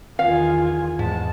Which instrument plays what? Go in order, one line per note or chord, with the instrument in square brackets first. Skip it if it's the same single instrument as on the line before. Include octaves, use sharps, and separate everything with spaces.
[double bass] E2 D#3 [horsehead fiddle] F4 G#5 [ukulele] F5
[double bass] E2 [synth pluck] G#2 [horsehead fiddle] A5